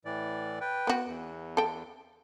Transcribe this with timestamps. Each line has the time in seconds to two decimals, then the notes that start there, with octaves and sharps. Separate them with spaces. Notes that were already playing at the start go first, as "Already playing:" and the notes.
0.05 A2 E3 D5
0.61 B4 G5
0.87 B3 F#4
1.06 E2
1.57 A4 G5